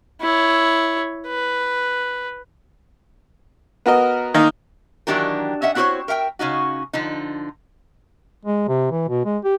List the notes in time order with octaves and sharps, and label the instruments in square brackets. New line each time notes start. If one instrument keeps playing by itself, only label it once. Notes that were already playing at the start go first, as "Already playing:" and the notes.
[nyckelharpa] E4 C#5
B4
[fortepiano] B3 F#4 A#4 D#5
D#3 A#3 D#4
[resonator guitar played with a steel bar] D#3 E3 F#3 D4 G4 A#4
C#4 D#5 E5 F#5
C4 E4 F#4 A#4 C5 C#5
A#4 E5 F#5 G5
C#3 C#4 D#4 F#4
D3 F3 D#4
[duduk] G#3
C3
E3
B2
G#3
G4